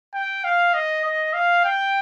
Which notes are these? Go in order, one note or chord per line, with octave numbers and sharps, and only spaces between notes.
G5
F5
D#5
D#5
F5
G5